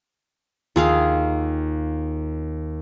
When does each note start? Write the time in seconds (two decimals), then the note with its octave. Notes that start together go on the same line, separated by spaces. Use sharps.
0.76 D#2 F4 G#4 F5